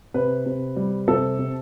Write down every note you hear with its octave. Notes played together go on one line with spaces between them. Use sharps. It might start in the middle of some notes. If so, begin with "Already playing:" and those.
C3 B4
C3
G3
C3 A4
C3